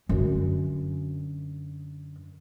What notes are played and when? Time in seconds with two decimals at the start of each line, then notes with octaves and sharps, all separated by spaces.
0.09 F#2 D3